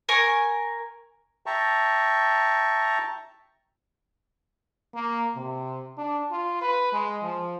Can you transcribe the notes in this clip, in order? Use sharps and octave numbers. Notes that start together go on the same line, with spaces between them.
A#4 G#5 C#6
E5 G5 A5 A#5 C#6
A#3
C3
D4
F4
B4
G#3
F3